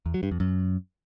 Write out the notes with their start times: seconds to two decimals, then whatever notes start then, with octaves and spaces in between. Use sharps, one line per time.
0.06 E2
0.14 F#3
0.23 G2
0.31 F2
0.40 F#2